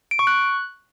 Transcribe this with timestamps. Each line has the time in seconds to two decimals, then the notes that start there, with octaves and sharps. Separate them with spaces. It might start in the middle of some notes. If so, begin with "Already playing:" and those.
0.11 D7
0.19 C#6
0.27 F#6